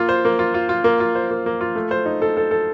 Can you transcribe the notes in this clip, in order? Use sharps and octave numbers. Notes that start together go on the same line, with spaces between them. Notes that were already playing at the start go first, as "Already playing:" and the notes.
Already playing: A#3 F4
C5
A#3
F4
F4
F4
A#3
F4
C5
A#3
A#3
F4
A3
C5
D#4
A4
A4
A4